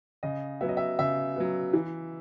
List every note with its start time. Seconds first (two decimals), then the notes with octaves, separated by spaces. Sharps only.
0.23 C#3 D#5
0.61 F#3 B3 E5
0.69 D#5
0.77 E5
0.99 C#3 E5
1.36 F#3 B3
1.73 E3